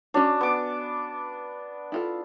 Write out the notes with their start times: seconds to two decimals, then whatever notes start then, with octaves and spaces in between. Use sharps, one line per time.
0.14 C#4 D4 F#4 C#5
0.41 B3 D6
1.92 E4 F4 A4